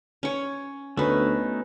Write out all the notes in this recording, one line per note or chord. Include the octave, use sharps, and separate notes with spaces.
C#4 C#5
D2 A3 B3 C#4 D#4 B4